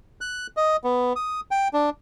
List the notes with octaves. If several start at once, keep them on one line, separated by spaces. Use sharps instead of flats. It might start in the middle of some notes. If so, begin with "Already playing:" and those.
F#6
D#5
B3
D#6
G5
D4